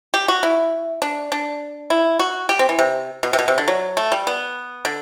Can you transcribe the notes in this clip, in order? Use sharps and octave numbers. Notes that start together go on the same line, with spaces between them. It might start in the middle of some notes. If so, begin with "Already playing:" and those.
G4
F#4
E4
D4
D4
E4
F#4
G4
C4
E3
C3
B2
C3
B2
C3
D3
F#3
A3
G3
B3
D3